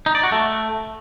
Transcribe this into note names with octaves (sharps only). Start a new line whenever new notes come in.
D#4
D5
F#4
A3